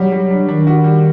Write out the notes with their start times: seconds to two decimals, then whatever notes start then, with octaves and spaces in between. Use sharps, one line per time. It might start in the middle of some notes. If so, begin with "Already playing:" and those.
Already playing: F#3 G3 F#4
0.12 G3
0.31 D4
0.48 D#3 D4
0.67 F#4
0.84 G3